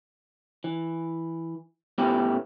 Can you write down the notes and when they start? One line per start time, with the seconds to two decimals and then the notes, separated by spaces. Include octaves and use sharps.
0.64 E3
1.98 A2 B3 C#4 E4 G4